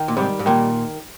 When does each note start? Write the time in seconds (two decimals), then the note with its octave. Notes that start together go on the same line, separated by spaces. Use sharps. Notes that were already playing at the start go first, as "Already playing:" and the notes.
Already playing: D#3
0.08 A#2
0.17 G#2 C3 G3
0.39 G#2
0.46 A#2 D#3